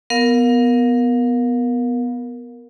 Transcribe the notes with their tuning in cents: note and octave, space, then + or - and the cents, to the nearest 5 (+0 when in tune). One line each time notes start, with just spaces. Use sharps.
B3 +0 A#4 +0 F5 +30